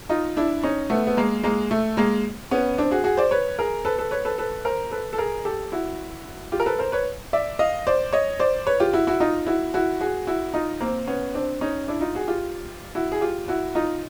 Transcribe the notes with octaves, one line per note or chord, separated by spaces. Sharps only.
D#4 F4
D4 E4
C#4 D#4
A3 B3
B3
G#3 A#3
G#3 A#3
A3
G#3 A#3
B3 C#4
C4 D4
F#4 G#4
F#4 G#4
C5 D5
B4 C#5
G#4 A#4
A4 B4
A4 B4
B4 C#5
A4 B4
A4 B4
A#4 C5
A4 B4
A4
G#4 A#4
G4 A4
E4 F#4
F4 G4
A#4
A4 B4
A#4 C5
B4 C#5
D5 E5
D#5 F5
C5 D5
C#5 D#5
C5 D5
B4 C#5
F4 G4
E4 F#4
E4 F#4
D#4 F4
E4 F#4
E4 F#4
F#4 G#4
E4 F#4
D#4 F4
A#3 C4
B3 C#4
C4 D4
C#4 D#4
D4 E4
D#4 F4
F#4 G#4
F4 G4
E4 F#4
G#4
F4 G4
E4 F#4
D#4 F4